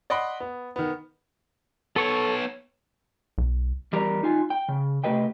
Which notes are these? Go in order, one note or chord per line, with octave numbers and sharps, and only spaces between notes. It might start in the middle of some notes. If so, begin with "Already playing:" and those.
D5 D#5 F#5 B5 C6
B3
D#3 B3
B3 A4 C#5 C#6
B1
E2 G3 G4 A#4 D5 A#5
D#4 F4 G#5
G5
C#3
C3 A3 G4 B4 D#5 G5